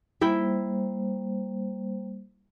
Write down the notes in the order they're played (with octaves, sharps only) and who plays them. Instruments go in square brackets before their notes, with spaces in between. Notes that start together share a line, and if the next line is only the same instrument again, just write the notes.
[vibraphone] G3 A#3 C5 [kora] E4 E5 G5